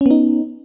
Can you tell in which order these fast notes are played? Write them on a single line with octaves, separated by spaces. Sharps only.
C#4 B3 D#4